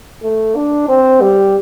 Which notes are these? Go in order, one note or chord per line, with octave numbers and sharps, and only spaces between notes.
A3
D4
C4
G3